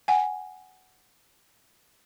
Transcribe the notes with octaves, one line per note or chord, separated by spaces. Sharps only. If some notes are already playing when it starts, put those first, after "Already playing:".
F#5 G#5